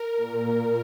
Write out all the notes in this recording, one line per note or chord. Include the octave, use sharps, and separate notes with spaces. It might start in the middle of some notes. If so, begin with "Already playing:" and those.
Already playing: A#4
A#2